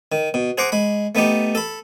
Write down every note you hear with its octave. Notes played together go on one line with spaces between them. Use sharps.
D#3
B2
G#4 C5 F#5 A#5 C6 D6
G#3 B5
A3 B3 D#4 G4
A4 B5